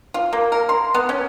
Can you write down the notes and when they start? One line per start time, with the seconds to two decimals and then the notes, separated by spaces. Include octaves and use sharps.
0.14 F4
0.33 A#3
0.52 A#4
0.69 C6
0.94 B3
1.09 C#4